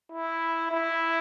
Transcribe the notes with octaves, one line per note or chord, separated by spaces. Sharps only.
E4
E4